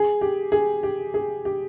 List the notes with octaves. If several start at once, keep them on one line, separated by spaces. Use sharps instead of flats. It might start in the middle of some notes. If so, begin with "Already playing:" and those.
Already playing: G#4
G4
G#4
G4
G#4
G4